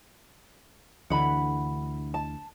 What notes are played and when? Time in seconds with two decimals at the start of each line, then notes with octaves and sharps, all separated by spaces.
1.10 D2 D3 E3 F#5 B5
2.14 A5